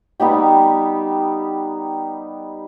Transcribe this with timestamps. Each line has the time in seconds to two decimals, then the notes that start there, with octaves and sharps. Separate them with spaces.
0.20 G3 B3 D#4 G4